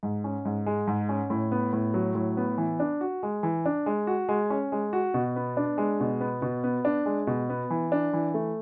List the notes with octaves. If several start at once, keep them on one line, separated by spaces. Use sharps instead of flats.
G#2
C#4
G#2
G#3
G#2
C#4
A2
B3
A2
F#3
A2
B3
E3
D4
F#4
G#3
E3
D4
G#3
F#4
G#3
C#4
G#3
F#4
B2
B3
D4
G#3
B2
B3
B2
B3
D4
G#3
B2
B3
E3
D4
E3
A3